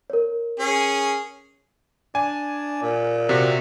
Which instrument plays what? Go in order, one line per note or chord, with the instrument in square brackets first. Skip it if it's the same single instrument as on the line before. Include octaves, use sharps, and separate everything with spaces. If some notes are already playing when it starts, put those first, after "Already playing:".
[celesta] A#4 C#5
[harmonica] C#4 G#4
[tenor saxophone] D4 [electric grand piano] G#5
[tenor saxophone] A#2
[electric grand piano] C3 F#4